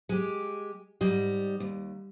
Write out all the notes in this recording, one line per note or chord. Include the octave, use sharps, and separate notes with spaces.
G#3 G4
G#2 G3 D#5
D#2